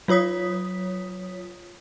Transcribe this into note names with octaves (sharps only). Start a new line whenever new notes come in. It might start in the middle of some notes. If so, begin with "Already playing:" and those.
F#3 F4 C#5 D#6 B6